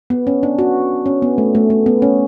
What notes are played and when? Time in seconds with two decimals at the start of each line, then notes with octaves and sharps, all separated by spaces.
0.10 B3
0.27 C#4
0.43 D4
0.59 F#4
1.06 C#4
1.22 B3
1.38 A3
1.55 A3
1.70 A3
1.86 B3
2.02 C#4